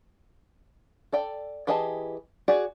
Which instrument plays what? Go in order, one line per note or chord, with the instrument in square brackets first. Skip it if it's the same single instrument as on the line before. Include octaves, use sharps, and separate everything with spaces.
[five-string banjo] A4 D5 G5
E3 G4 G#4 D#5 A5
F#4 G#4 D5